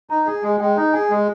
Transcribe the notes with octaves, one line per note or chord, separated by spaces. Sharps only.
D#4 A#5
G#4
G#3 G#5
G#3 G5
D#4
G#4 G#5
G#3